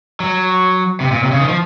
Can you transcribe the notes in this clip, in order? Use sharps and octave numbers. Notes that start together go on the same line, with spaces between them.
F#3
C3
A#2
C3
C#3
D#3
F3